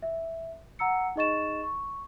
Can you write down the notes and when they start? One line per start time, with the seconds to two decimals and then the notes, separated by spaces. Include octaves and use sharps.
0.02 E5
0.79 F#5 A#5 E6 C#7
1.16 D#4 G#4 D#5 C#6 A6 E7
1.63 C#6